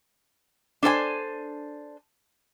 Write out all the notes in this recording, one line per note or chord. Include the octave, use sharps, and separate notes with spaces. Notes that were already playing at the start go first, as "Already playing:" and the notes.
D4 A4 C5 G#5